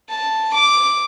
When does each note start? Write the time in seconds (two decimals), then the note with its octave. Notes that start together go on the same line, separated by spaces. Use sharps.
0.10 A5
0.54 D6